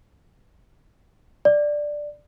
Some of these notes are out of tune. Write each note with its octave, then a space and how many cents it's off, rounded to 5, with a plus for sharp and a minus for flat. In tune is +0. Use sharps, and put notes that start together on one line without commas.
D5 +5